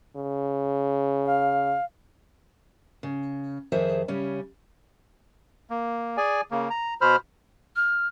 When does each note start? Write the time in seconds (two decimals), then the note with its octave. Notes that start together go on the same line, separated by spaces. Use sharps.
0.16 C#3
1.26 F5
3.03 C#3
3.72 F2 D#3 G#4 C5 E5
4.08 C#3 G3 C#4
5.70 A#3
6.17 G#4 D5 G#5
6.51 C#3 A#3
6.70 A#5
7.01 B2 C5 B5 F6
7.76 F6